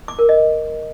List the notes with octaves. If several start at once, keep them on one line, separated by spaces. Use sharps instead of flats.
D6
A#4
D#5